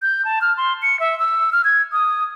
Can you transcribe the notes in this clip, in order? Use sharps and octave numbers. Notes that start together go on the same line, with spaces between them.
G6
A5
F6
C6
C#7
E5
E6
F6
G#6
D#6